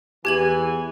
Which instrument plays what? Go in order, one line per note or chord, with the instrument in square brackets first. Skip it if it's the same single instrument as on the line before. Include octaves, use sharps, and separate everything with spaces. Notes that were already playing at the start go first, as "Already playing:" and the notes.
[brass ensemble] E2 E3 G#5 [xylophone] G4 G#6 F#7